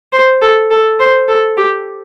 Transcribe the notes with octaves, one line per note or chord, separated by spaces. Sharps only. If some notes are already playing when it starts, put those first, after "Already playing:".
C5
A4
A4
C5
A4
G4